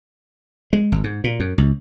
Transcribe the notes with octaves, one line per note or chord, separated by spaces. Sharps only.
G#3
G#1
G#2
A#2
F#2
C#2